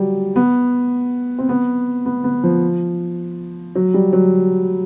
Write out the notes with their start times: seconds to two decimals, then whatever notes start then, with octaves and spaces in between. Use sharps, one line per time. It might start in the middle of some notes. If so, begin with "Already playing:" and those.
Already playing: F#3 G3
0.36 B3
1.38 C4
1.49 B3
2.06 B3
2.24 B3
2.43 F3
3.75 F#3
3.94 G3
4.13 F#3